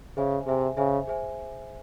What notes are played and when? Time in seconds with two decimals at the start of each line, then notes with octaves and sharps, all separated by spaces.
0.17 C#3 G#4 C5 E5 G#5
0.46 C3 G#4 C5 E5 G#5
0.77 C#3 G#4 C5 E5 G#5
1.07 G#4 C5 E5 G#5